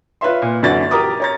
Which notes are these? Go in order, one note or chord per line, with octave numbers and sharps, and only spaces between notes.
F4 B4 C#5 E5 C6
A#2
F#2 D3 E3 F#4 D5 A6
G4 A#4 A#5 D6 D#6
C#5 A#5 A6